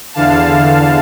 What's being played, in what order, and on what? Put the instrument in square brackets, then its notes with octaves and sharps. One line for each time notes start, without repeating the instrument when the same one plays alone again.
[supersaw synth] E2 D3 F5 A5